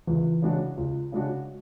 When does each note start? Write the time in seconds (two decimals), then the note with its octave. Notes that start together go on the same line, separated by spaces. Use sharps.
0.07 C#2 E3
0.42 C#3 G#3 D4 F#4
0.77 C#2
1.12 C#3 G#3 D4 F#4